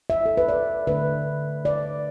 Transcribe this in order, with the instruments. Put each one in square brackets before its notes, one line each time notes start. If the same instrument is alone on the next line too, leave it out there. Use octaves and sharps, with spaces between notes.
[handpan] E5
A4
B4
D5
D3 A3 D4 B4
D5